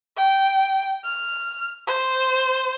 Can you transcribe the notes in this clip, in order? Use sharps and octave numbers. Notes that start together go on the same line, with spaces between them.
G5
F6
C5